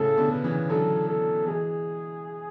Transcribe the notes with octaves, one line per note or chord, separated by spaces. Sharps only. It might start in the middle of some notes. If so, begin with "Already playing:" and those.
Already playing: A2 C#3 A4
B2 D3
B4
C#3 E3
D3 F#3 A4
A4
E3 G#3 G#4